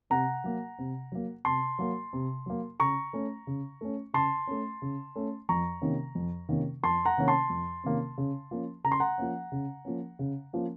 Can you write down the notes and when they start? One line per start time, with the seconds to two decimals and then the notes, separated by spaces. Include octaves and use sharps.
0.10 C3 F#5 A#5
0.44 F#3 A#3
0.79 C3
1.12 F#3 A#3
1.45 C3 A5 C6
1.79 F#3 A#3
2.13 C3
2.46 F#3 A#3
2.80 C#3 A#5 C#6
3.13 A3 C#4
3.47 C#3
3.81 A3 C#4
4.13 C#3 A5 C6
4.47 A3 C#4
4.82 C#3
5.15 A3 C#4
5.49 F2 A#5 C#6
5.82 C3 D#3 A#3 C#4
6.15 F2
6.49 C3 D#3 A#3 C#4
6.83 F2 A5 C6
7.05 F#5 A#5
7.17 C3 D#3 A#3 C#4
7.28 A5 C6
7.50 F2
7.84 C3 D#3 A#3 C#4
8.18 C#3
8.51 F3 A#3 C#4
8.84 C#3 A#5
8.92 C6
9.00 F#5 A#5
9.18 F3 A#3 C#4
9.52 C#3
9.85 F3 A#3 C#4
10.19 C#3
10.53 F3 A#3 C#4